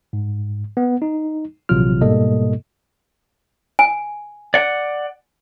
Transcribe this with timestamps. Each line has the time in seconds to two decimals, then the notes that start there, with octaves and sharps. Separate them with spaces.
0.13 G#2
0.77 B3
1.02 D#4
1.69 A#1 C3 E3 F#3 F4 F6
2.01 G#2 B2 G3 A#3 A4 D#5
3.79 G#5
4.54 D5 F#5